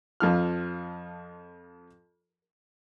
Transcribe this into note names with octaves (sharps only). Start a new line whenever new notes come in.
F2 F3 F6